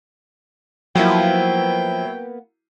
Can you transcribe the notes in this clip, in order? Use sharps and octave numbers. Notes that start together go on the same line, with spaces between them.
F3 F#3 A#3 B3 E4 B4 G5